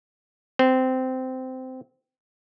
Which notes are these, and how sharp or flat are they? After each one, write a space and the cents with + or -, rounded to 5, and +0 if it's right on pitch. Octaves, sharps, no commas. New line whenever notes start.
C4 -15